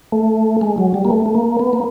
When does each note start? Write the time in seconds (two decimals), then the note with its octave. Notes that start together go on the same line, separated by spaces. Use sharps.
0.12 A3
0.61 G#3
0.78 F#3
0.94 G3
1.05 A#3
1.10 A3
1.26 A3
1.35 A#3
1.60 B3
1.73 A#3